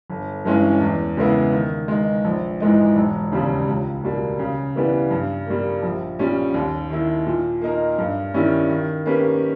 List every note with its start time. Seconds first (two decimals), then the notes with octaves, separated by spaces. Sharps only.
0.10 G1
0.45 G2 E3 G#3 C#4
0.81 E2
1.17 C#3 G#3 B3 E4
1.53 D#3
1.88 G#3 D#4
2.25 A#1
2.60 G#2 E3 G#3 D#4
2.96 E1
3.31 D#2 C#3 G3
3.68 C#2
4.04 B2 G3 A#3
4.39 C#3
4.76 E3 G3 B3
5.11 G2
5.47 G3 A#3
5.82 A#1
6.19 A#2 G3 C#4
6.54 D#2
6.90 D#3 A#3 E4
7.27 A#2
7.62 A#3 D#4 A#4
7.98 G2
8.34 D#3 G3 C#4 E4
8.69 D#3
9.06 A#3 C#4 G4 B4